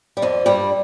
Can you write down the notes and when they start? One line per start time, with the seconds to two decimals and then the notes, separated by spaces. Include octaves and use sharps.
0.17 G3
0.22 F2 F3 D5
0.46 G2 G3